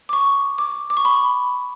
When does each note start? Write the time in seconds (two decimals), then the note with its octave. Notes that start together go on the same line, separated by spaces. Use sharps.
0.09 D6
0.13 C#6
0.58 D6
0.90 D6
0.97 C#6
1.05 B5